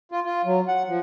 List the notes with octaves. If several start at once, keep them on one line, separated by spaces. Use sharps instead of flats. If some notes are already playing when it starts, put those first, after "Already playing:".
F4
F4
F#3
F#5
F3